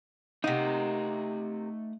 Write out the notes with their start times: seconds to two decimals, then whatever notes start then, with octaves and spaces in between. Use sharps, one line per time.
0.44 C3 A3 A#3 D#4 F#5